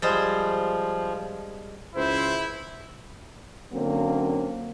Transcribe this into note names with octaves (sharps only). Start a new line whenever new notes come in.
F3 G3 G#3 C5
C#2 C#4 E4 C5
D3 F#3 A#3 C4 C#4